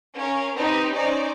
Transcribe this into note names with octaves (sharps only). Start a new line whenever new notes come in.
C#4 A#4 F5
C4 D#4 G4 B4
C#4 D#4 C5 D5